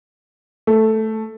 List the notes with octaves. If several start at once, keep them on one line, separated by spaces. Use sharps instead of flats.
A3